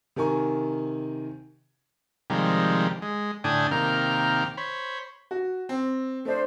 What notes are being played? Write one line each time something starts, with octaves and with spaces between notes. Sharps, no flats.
C3 D#3 A#4 G#5 C#6
C3 D#3 F3 G3 G#3
G#3
A2 D3 D4 G5 G#5 D#6
C3 D#3 A#3 G5 F6
C5 C#5 B5
F#4
C4
A3 D4 C5